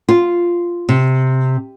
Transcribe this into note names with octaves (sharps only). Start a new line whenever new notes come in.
F4
C3